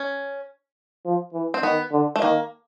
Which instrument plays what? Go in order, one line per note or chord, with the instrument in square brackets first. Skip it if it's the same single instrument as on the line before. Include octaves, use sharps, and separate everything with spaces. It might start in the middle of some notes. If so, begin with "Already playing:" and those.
Already playing: [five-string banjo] C#4
[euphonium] F3
E3
[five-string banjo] C4
[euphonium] D#3 [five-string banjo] B3
[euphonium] D3
[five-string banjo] A3
[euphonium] D#3 [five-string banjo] A#3